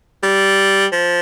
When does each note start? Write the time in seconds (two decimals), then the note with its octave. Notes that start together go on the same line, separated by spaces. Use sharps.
0.23 G3
0.93 F3